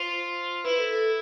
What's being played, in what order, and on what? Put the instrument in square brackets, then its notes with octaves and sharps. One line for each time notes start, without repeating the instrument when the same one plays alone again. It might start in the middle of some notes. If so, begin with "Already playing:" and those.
Already playing: [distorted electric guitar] F4 [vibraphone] C5
[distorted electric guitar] E4 [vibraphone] B4
[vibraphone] A4
A4